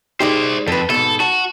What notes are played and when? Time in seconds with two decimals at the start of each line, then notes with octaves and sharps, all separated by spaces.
0.20 G#3 D#4 G4 C5 D5
0.68 F2 A4 B4
0.90 G#2 B2 A4
1.20 F#4 A5